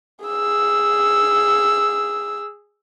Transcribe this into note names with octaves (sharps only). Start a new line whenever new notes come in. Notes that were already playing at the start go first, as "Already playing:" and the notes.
G#4 E6